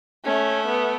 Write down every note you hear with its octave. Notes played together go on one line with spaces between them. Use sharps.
A3 C#4
B3